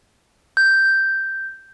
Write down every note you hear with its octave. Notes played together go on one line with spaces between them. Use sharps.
G6